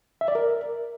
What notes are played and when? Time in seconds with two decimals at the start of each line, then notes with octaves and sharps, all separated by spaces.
0.21 E5
0.28 D5
0.35 A#4